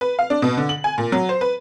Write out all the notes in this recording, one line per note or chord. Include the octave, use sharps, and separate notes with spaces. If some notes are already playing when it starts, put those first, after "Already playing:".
B4
F5
D4
B2
D3
F#7
G#5
A#2
F#3
C5
B4